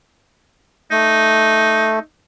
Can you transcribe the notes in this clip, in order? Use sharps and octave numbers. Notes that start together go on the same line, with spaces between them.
A3 D#4